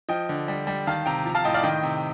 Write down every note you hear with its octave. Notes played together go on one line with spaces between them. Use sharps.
F3 D#5 G5
D3
G3
G3
D#3 F5 A5
C3 G5 A#5
F3 A#5
F5 A5
A2 D#5 G5
D5 F5
D#3 D#5 G5
C3